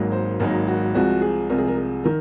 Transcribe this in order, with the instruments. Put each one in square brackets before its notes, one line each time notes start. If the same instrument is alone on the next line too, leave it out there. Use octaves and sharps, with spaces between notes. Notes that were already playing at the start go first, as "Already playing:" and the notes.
Already playing: [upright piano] G#1 G#2 F#3 A#3 D#4
C5
G#1 G#2 F#3 A#3 D#4 A#4
F#4
C2 C3 F3 G#3 F#4
G#4
C2 C3 F3 G#3 A#4
G#4
A#4
G#4
D#3 A#4